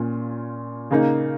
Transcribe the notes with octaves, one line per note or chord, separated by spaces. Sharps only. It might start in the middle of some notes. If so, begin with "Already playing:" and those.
Already playing: A#2 C#4 F4
C#3 A#3 D#4